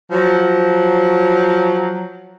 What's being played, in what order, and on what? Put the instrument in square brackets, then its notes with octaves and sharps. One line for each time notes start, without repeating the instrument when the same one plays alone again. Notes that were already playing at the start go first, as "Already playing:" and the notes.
[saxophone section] F3 F#3